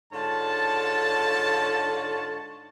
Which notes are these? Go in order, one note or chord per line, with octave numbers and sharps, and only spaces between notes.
G#2 D3 F4 C#5 A5